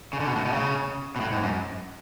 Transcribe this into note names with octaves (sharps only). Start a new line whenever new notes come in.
C#3
D3
B2
A2
B2
C#3
B2
A2
G#2
F#2